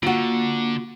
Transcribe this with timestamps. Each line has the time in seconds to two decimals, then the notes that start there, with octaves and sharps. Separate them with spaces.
0.03 D3 A#3 F4 F#4